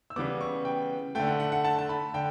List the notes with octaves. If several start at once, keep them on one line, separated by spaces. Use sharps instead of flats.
E6
C#3 E3 G3 B3 D6
C#6
G5
D3 A3 G5
F#5
F#5
F#5
A5
A5
B5
D3 G5